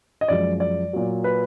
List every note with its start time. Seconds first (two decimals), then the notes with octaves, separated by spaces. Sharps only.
0.21 D#5
0.28 F#2 F3 G#3 D5
0.60 D5
0.93 A#2 F#3
1.24 B4